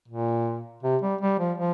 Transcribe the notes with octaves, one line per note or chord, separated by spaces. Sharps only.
A#2
C3
G3
G3
F3
F3